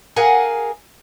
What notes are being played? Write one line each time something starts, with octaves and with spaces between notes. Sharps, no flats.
G#4 A#4 F5 F#5 G#5